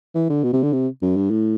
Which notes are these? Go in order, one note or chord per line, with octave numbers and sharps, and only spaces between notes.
E3
D3
B2
C3
D3
C3
F#2
G2
A2